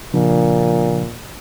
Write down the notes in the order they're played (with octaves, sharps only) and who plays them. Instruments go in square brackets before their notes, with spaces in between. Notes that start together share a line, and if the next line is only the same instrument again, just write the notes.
[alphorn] A#2 [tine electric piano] C#3 F3 D4